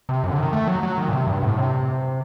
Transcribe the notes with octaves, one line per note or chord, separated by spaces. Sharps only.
C3
F#2
D3
D#3
A3
F#3
F#3
D#3
A#2
C3
G2
A2
C3